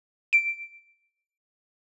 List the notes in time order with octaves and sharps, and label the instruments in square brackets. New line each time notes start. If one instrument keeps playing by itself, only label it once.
[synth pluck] D7